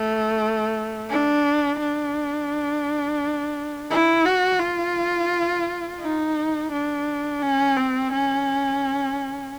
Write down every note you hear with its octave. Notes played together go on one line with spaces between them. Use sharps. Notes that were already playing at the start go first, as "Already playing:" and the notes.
Already playing: A3
D4
D4
E4
F#4
F4
D#4
D4
C#4
C4
C#4